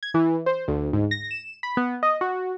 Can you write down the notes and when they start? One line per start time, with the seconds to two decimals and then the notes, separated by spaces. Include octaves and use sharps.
0.03 G#6
0.14 E3
0.46 C5
0.68 D2
0.93 G#2
1.11 A#6
1.31 E7
1.63 B5
1.77 B3
2.03 D#5
2.21 F#4